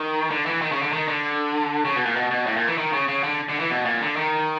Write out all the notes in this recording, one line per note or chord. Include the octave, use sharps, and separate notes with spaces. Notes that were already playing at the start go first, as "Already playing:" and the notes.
Already playing: D#3
D3
E3
D#3
C#3
D3
D#3
D3
C#3
B2
A#2
B2
B2
A2
A#2
E3
D#3
C#3
C#3
D3
D3
E3
B2
A#2
D3
D#3